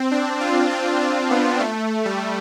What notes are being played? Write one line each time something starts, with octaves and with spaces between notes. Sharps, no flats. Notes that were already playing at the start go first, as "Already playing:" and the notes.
Already playing: C4
D4
F4
F4
C4
B3
A3
G3